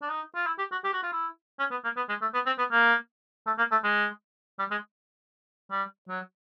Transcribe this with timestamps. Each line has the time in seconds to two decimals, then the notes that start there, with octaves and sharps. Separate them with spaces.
0.02 D4
0.10 D#4
0.35 F4
0.47 E4
0.59 G4
0.72 F#4
0.84 G4
0.93 F#4
1.03 F4
1.12 E4
1.59 C#4
1.71 B3
1.84 A#3
1.96 B3
2.09 G#3
2.21 A3
2.34 B3
2.46 C4
2.58 B3
2.71 A#3
3.46 A3
3.58 A#3
3.71 A3
3.84 G#3
4.59 G3
4.71 G#3
5.71 G3
6.08 F#3